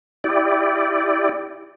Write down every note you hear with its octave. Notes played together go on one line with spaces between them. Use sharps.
E4 G4 D5